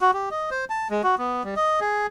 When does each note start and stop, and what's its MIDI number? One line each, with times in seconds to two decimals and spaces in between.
0.01 0.11 66
0.13 0.29 67
0.31 0.50 75
0.51 0.65 72
0.70 0.88 81
0.90 1.02 56
1.04 1.15 66
1.18 1.43 59
1.44 1.54 55
1.56 1.80 75
1.81 2.07 68